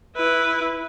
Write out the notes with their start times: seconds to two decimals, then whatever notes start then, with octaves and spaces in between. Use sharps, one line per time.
0.16 E4 B4